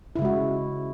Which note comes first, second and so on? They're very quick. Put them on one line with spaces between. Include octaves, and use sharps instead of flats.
E4 C#3 G#3 F#4